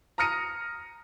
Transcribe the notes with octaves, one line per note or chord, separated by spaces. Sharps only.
A#5 D#6 F6 A#6 C#7 D#7